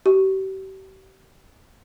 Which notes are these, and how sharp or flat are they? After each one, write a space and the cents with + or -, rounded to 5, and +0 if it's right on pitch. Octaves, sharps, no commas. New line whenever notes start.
G4 -40